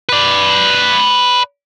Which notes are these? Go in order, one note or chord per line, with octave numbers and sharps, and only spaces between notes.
B4 D5